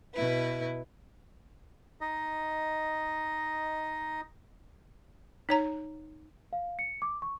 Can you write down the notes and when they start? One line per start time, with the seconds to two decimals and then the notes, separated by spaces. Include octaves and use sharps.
0.14 B2 E4 B4
2.01 D#4 D#5
5.49 D#4 C#5 A#5
6.53 F5
6.79 C#7
7.02 D6
7.22 C#6